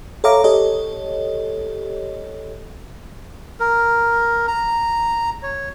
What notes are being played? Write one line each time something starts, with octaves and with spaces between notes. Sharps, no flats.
A4 C#5 E5 F5 A#5 D6
G4 A4 C#5 D#5
A#4
A#5
C#5